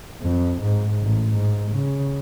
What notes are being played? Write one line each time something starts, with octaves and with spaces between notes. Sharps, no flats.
F2
G#2
A1
G#2
C#3